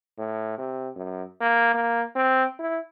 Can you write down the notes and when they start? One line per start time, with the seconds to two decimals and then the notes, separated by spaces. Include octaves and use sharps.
0.18 A2
0.58 C3
0.95 F#2
1.41 A#3
1.74 A#3
2.15 C4
2.59 E4